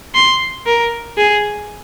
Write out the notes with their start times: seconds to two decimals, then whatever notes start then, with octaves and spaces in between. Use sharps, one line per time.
0.15 C6
0.67 A#4
1.18 G#4